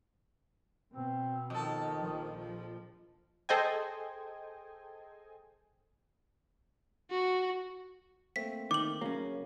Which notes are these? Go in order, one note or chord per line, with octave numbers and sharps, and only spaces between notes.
B2 C4
F2 D#3 A4
A#1 F3
G#4 A4 C5 D#5 G5 G#5
F#4
A3 A#3 C4 B6
D#3 D6 F#7
C#3 F#3 A#3 C#4